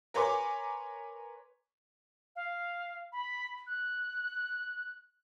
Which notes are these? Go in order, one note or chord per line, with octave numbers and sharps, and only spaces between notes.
A#4 B4 C#5 G#5 C6 D6
F5
B5
F#6